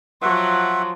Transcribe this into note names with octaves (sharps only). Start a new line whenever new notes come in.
F3 F#3 E5 F#5 C6